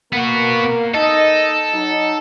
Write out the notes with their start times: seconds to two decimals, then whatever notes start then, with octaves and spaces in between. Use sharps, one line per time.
0.13 A#3 B3 F#4
0.95 D#4 A4 D#5
1.74 F#3 D#4